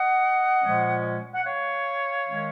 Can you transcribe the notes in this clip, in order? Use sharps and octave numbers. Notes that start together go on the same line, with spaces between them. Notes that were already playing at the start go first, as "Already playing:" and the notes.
Already playing: D#5 F#5
A#2 F3 G#3 C#4
F#5
C#5 F5
D#3 G#3 C#4